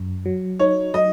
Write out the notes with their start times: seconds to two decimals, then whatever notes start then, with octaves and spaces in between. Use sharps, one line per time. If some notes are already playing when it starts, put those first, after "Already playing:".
Already playing: F#2
0.26 F#3
0.59 D#4 C#5
0.94 F#3 D#5